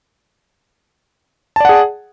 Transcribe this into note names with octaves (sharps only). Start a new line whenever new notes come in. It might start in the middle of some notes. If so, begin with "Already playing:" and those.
G#4 D5 F#5 A5